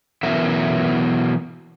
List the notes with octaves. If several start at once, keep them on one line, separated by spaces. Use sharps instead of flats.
B2 E3 F#3 B3 A#4 E5